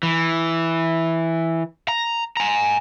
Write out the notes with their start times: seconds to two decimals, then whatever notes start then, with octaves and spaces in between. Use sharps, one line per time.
0.03 E3
1.88 A#5
2.37 G#5 A#5